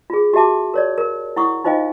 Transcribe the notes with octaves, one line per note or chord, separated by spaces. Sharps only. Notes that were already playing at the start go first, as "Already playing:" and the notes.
F4 G#4
F#4 G4 E5 A5 D6
A#4 C#5 D5
A#4
E4 F#5 C#6 D#6
D#4 F4 C5 D#5 F5 G5